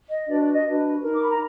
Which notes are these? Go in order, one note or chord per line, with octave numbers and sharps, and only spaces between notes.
D#5
D4 F#4 B4 D5
D5
D#5
D4 F#4 B4
D#4 A#4
D6
B5
A#5